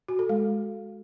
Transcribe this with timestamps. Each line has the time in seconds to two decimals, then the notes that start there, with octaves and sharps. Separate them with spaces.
0.08 F#4
0.19 A4
0.29 G#3